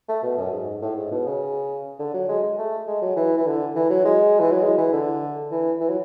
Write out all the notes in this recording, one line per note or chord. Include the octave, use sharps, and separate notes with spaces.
A3
B2
F#2
G#2
A2
G#2
B2
C#3
D3
F#3
G#3
G#3
A3
G#3
F#3
E3
E3
D3
E3
F#3
G#3
E3
F#3
G#3
E3
D3
E3
E3
F#3